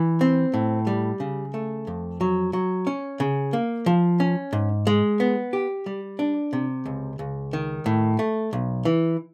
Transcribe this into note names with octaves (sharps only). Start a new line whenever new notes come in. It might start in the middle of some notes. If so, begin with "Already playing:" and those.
Already playing: E3
C4
A2
G3
C#3
A3
F2
F#3
F#3
C#4
C#3
A#3
F3
C#4
G#2
G#3
B3
G4
G3
D4
C3
C#2
C#2
D#3
A2
A3
B1
E3